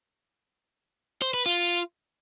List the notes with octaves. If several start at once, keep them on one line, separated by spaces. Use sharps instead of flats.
C5
B4
F4